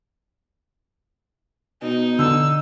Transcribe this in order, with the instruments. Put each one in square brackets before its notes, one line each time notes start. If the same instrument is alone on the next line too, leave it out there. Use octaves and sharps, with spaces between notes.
[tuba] B2 [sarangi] D#4
[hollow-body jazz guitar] D3 [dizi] E6